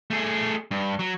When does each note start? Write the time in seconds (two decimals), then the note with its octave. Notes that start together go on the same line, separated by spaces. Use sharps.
0.10 A3 G#4
0.71 G2
0.99 F#3